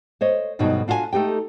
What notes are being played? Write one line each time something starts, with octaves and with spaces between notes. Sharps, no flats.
C5 C#5 D#5
D2 G2 B2 F#3 D#4 C#5
D4 F4 F#4 D#5 G#5
A3 D#4 G4 G5